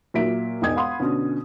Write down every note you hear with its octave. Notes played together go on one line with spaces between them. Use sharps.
A#2 F#3 E5 B6 D7
E1 G#2 D#5 G5 D#6 G#6
F5 F#5 B5 C6 D#6
B2 D3 C#4